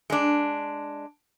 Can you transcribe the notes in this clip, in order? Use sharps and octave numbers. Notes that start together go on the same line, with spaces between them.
G#3 D4